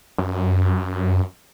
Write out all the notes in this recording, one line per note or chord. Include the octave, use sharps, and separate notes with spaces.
F#2